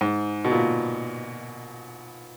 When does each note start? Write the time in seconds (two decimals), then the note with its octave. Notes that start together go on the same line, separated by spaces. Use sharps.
0.01 G#2
0.45 B2
0.51 A#2